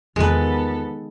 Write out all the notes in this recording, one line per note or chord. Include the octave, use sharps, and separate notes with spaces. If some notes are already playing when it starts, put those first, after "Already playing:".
E2 D#3 G#3 B3 F4 A4 B4